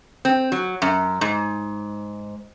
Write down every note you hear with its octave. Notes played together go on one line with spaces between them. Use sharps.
C4
F#3
F#2
G#2